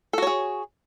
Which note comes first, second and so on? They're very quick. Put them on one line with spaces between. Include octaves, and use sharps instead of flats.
A4 F#4 C#5 G#4